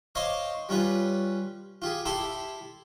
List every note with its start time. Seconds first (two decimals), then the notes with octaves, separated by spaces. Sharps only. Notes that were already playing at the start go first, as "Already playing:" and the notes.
0.15 C5 C#5 D#5 F5 C6 D6
0.69 G3 C#4 F4 B4
1.82 F4 G4 G#4
2.05 E4 G4 A4 G5 B5 C6